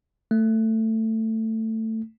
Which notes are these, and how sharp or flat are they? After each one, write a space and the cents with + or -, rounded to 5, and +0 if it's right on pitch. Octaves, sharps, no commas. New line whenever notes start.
A3 +15